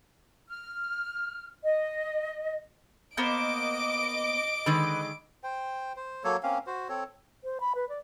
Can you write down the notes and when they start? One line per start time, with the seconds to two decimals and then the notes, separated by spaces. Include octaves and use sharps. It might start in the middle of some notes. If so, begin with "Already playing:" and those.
0.49 F6
1.64 D#5
3.17 A#3 B3 C5 D#5 D6 D7
4.66 D3 D#3 G#3 B4
5.44 C5 G5
5.96 C5
6.24 F#3 A#3 A4 C#5
6.43 A#3 C4 C#4 F5
6.67 F#4 C5
6.89 C4 A4 C#5
7.44 C5
7.60 B5
7.75 B4
7.89 D5